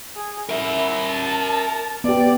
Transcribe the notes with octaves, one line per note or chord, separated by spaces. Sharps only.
G#4
E4 A#4 E5
A5
B3 G4 D5